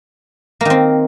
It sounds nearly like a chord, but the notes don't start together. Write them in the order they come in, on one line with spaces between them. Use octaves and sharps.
A#3 D#3 C4